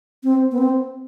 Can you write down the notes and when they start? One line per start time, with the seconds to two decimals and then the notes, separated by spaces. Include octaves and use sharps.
0.24 C4
0.51 B3
0.58 C4